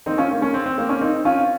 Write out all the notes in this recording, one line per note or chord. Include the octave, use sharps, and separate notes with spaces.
D#3 A#3 C4 D#4
C#4 F4
A#3
A#3 C#4
C4
C4
A#3
A#3 C#4
C4 D#4
C#4 F4